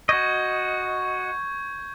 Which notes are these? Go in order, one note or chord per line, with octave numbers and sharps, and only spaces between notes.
F#4 D#5 C#6 G6 G#6